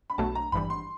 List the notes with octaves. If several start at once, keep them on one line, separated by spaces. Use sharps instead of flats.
B5
B1 B2 F#3 A3 A5
A#5
G#1 G2 E3 G3 B5
C6